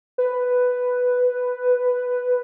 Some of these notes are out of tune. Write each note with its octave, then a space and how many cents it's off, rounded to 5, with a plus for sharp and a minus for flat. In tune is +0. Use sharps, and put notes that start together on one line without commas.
B4 +5